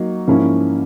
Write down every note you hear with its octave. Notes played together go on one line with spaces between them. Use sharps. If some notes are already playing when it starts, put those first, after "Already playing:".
Already playing: F#3 A#3 D#4
G#2 F3 A#3 C#4 E4